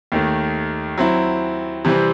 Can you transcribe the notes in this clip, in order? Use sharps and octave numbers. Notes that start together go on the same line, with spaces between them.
D#2 D#3 A3
F#3 C4 E4
C3 E3 G3 C4